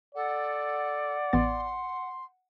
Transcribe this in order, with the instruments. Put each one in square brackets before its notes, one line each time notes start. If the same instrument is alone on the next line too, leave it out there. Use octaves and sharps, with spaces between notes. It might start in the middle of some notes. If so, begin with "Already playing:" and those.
[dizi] A4 [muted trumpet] D5 [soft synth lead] F#5
[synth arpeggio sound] A1 B3 A6 [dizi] C6